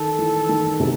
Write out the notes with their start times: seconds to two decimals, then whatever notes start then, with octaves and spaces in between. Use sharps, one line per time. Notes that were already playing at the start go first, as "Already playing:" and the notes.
Already playing: D#3 A4
0.19 E3
0.49 D#3
0.80 C3